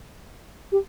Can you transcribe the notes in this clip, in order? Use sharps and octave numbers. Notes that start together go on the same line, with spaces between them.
G4